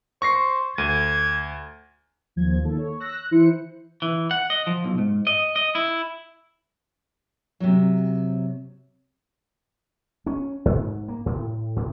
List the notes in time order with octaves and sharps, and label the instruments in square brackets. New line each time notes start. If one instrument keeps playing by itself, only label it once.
[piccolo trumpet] C5 [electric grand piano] C#6 A#6 C7
[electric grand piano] D2 D#7 [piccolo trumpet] G#6
[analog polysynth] D#2 F3 G#6
D#3 A#3 A4
C#5
E6 F#6 A#6
F#6
E3 E4 C5 C#7
[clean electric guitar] E3
F#5
D#5
F3
B1
G#2
D#5
D#5
E4
[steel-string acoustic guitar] C3 F#3
[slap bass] C#4
G#2
A#3
A2
A2